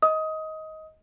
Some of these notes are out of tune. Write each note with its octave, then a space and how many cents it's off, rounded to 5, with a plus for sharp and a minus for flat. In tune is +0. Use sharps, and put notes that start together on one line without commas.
D#5 +15 D#6 +20